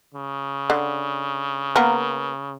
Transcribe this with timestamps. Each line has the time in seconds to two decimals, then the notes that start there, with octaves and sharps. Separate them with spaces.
0.15 C#3
0.70 D3
1.76 A#3 B3 A#4